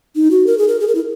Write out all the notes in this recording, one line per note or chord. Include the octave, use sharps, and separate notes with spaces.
D#4
F#4
A#4
G#4
A#4
G#4
A#4
E4